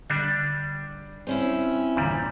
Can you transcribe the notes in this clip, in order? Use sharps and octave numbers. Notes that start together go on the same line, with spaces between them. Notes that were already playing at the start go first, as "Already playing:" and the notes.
D3 G3 D4
C4 C#4 E4
G1 E2 A#2 D3 G3